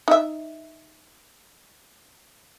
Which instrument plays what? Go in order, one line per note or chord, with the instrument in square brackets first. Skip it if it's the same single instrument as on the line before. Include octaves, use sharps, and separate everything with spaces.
[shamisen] D#4 E5